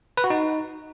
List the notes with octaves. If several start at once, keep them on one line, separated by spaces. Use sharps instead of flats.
B4
F#4
D#4